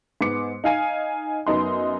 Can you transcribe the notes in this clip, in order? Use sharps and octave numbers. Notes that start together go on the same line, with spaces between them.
G#2 B3 D6 C#7
D#4 F5 G#5
F#2 B3 D#4 C6